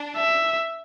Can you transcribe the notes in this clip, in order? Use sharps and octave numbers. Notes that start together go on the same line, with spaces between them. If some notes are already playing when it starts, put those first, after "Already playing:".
Already playing: D4
E5